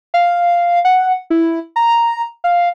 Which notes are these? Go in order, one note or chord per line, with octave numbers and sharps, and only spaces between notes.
F5
F#5
E4
A#5
F5